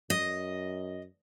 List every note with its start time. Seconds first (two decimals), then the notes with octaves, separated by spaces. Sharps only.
0.10 F#2 D#5